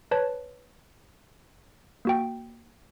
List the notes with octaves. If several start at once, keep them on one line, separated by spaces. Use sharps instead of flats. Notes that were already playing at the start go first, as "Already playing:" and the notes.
B4 C#5 A5
A#3 F#4 G5